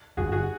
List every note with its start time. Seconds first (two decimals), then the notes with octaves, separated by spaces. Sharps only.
0.17 G1 F#2 D3 F#4 G#4
0.32 F#4 G#4